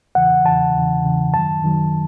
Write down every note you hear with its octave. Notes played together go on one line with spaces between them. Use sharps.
E2 C#3 E3 F#5
E2 C#3 E3 A5
E2 C#3 E3
E2 C#3 E3
F#2 D#3 F#3 A5
F#2 D#3 F#3